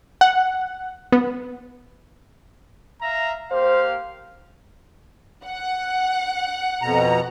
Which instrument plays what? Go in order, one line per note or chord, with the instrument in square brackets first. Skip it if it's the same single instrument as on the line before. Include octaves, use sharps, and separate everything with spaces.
[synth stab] F#5
B3
[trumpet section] E5 F5 A#5
[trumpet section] A#3 G4 F5 [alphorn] C5
[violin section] F#5
[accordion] F2 B2 A#5